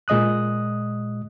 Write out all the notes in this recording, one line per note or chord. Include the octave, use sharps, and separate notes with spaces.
A#2 G#3 D#5 D#6 F#6